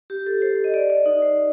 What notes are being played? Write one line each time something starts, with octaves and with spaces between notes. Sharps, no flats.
G4
A4
C5
D#5
D5
D5
D#4
C5